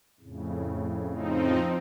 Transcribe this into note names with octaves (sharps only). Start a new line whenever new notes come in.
F2 A2 C#3
F3 C4 D#4